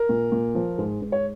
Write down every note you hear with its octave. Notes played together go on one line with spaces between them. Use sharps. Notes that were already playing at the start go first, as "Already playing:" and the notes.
Already playing: A#4
A#2
A#2
F3
G#2
G#2
C#5